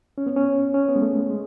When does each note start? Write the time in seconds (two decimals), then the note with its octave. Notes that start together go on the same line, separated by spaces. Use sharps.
0.18 C#4
0.26 B3
0.36 C#4
0.74 C#4
0.88 B3
0.96 G#3
1.02 A3
1.30 G#3